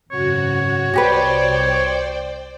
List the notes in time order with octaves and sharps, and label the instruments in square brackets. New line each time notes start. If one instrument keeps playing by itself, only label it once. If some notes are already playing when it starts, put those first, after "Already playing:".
[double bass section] G#1 F#2 C#3 [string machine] F#4 [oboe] C#5
[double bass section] C2 C3 [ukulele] F#4 G4 B4 [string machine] C5 D5 G5